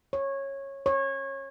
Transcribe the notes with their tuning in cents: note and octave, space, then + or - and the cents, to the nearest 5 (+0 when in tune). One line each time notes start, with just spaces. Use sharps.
C#5 -15
C#5 -25